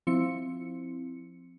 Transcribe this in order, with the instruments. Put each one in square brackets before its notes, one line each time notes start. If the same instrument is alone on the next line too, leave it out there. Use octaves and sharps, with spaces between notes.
[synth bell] F3 C4 E4 C#7